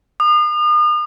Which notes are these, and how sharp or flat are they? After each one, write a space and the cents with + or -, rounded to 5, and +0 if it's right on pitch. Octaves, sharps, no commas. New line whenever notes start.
D#6 -40